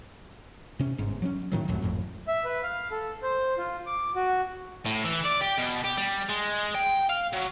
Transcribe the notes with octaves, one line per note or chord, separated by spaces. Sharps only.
C3 C#4
G1 G#2
F#3 G3 C#4
A2 D#3 F#3
C2 F#2 A2 F#3
G#1 F2 A2
E5
B4
F5
A4
C5
F4
D6
F#4
A2
E3
D5
G4
B2
G4
G3
G#3
G5
F5
F#3